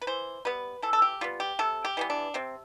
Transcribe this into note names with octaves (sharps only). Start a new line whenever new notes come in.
B4
E3 C5
G3 B3 B4
E3 A4
A4
G4
G3 B3 F4
G4
C3 A4
G4
E3 G3 B3
D4
C3 C4